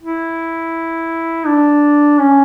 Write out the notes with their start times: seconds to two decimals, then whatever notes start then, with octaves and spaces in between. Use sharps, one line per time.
0.02 E4
1.47 D4
2.19 C#4